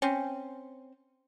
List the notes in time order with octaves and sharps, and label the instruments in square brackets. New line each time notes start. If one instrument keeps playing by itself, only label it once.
[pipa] C4 C#4